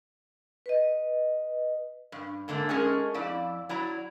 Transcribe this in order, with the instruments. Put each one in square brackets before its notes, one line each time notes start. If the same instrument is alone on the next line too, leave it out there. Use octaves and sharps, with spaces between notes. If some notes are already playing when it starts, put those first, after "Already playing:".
[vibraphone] B4 D#5
[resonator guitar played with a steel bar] G2
G#2 D3 A3 A#3
G#3 A3 C#4 D#4 G#4 A#4
F2 F3 E4 D5
F#3 E4 D5 A#5